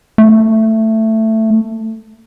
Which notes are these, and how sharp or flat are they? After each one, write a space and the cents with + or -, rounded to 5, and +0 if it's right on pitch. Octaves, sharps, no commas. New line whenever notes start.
A3 +10